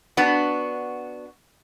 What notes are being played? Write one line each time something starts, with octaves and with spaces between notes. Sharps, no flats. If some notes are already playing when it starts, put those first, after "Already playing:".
B3 D4 F#4